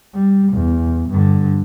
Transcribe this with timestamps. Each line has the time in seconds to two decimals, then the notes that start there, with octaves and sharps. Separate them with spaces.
0.14 G3
0.53 E2
1.10 G2 D3